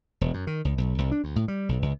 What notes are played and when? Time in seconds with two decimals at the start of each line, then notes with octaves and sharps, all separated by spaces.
0.21 E1
0.34 F#2
0.47 D#3
0.65 C#2
0.78 B1
0.98 C2
1.12 D4
1.24 D2
1.36 A2
1.48 G3
1.69 B1
1.82 C#2